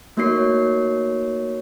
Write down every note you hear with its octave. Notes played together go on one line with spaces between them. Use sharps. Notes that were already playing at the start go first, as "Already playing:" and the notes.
A3 A#3 D#4 F#4 C#5 C7